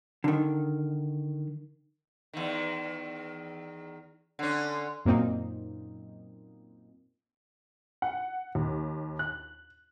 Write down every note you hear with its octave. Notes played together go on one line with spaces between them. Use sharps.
D3 D#3
E2 D#3
D3 C#4
F#2 A#2 A#3 C4 D#4
F#5
D#2
F#6